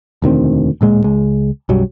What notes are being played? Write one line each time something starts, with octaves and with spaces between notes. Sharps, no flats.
E1 D2 D#3 C4
D1 A#2 G#3
C#2 G#3
B1 F#2 F#3 G3